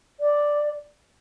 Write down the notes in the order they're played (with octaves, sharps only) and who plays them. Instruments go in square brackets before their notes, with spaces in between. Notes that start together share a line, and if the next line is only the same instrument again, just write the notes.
[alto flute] D5